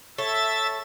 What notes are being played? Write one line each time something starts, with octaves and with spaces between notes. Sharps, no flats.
A4 C#5 E5 A6